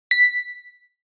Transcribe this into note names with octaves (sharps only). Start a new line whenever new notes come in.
B6